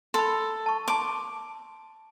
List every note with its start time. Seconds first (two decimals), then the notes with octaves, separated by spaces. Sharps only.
0.14 A4 B5 C6
0.66 A5 C#6
0.88 A5 C6 D6